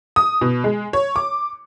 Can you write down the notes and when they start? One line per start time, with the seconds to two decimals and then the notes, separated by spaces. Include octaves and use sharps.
0.16 D#6
0.41 B2
0.64 G#3
0.93 C#5
1.16 D6